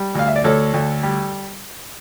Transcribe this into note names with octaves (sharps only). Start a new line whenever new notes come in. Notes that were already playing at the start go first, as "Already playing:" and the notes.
Already playing: G3
D2 F5
E5
D5
D2 A4 C#5
D2
G3